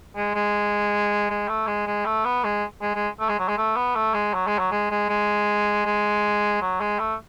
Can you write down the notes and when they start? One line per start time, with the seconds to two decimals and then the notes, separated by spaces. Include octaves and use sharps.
0.16 G#3
0.35 G#3
1.30 G#3
1.49 A3
1.67 G#3
1.87 G#3
2.06 A3
2.25 B3
2.44 G#3
2.82 G#3
2.95 G#3
3.20 A3
3.29 G#3
3.39 F#3
3.48 G#3
3.58 A3
3.76 B3
3.95 A3
4.14 G#3
4.34 F#3
4.47 G#3
4.59 F#3
4.71 G#3
4.91 G#3
5.09 G#3
5.85 G#3
6.62 F#3
6.80 G#3
6.99 A3